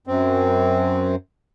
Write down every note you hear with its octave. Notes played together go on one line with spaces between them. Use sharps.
F#2 C4